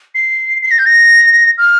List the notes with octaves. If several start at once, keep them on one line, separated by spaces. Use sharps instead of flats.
C7
C7
A#6
G6
A#6
F6